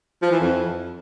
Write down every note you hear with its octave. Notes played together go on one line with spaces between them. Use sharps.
F3
E3
F2